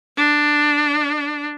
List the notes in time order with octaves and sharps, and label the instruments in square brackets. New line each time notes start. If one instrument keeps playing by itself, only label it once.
[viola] D4